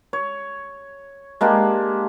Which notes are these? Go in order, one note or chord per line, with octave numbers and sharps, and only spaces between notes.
C#5
G#3 A#3 D4 G4